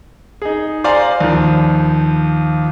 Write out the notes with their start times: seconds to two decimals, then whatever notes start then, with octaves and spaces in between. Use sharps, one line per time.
0.42 D#4 G#4
0.84 C5 D5 F5 G#5 A#5 C6
1.21 D#2 F3